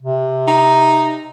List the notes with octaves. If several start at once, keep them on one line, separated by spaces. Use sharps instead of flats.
C3
D#4